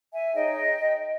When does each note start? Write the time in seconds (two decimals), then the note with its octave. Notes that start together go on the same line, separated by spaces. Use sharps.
0.11 E5 G#5
0.33 D#4 G#4 C#5 D#5 G5